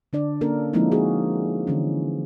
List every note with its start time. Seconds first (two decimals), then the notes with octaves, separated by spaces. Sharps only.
0.13 D3 D4 D5
0.41 A#3 C#4 D4 A4 A#4
0.73 F3 G#3 A#3 C4 D#4 E4
0.92 A#3 F#4 G#4
1.67 D3 E3 C#4